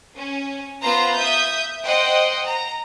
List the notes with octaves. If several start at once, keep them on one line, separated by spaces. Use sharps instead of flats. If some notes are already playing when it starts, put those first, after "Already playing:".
C#4
B3 F4 B4 C5 A#5
E5 D#6 G6
C5 D#5 F#5 G5
A#5